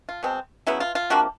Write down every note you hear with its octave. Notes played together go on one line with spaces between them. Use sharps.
F4
B2 G#3 C4
C#3 F#3 B3 E4
F4
F4
C3 F3 A#3 D4 F#4